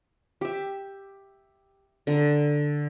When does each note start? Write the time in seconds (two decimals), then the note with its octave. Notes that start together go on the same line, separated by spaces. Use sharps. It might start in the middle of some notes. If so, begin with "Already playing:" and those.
0.41 G4 E5
2.07 D3 A#5